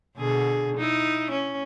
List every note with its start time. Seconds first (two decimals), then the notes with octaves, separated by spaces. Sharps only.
0.17 B2 D3 G#4
0.77 D#4 E4
1.31 C#4